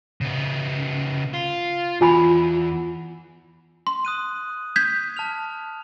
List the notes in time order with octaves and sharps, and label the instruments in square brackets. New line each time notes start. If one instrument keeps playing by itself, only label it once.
[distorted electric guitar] C#3 B3
F4
[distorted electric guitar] E2 [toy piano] F4 G#5 B5
[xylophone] C6
[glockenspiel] D#6 F#6 D#7
[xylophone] G6 G#6 B6
[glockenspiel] A5 F6 F7